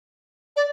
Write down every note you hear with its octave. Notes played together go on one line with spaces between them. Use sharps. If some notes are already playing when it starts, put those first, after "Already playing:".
D5